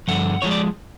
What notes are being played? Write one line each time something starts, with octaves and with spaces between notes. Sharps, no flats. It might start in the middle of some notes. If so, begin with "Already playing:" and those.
G2 D3 F3 F#5
D3 F3 G#3 C#5
D5